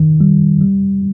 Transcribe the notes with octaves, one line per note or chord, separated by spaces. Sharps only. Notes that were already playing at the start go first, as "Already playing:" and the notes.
Already playing: D#3
G3
G3